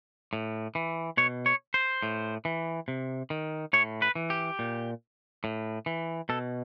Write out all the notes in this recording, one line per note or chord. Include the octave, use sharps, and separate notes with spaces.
A2
E3
B2 C#5
C#5
C5
A2
E3
C3
D#3
A2 C#5
B4
E3
G4
A#2
A2
E3
B2 A4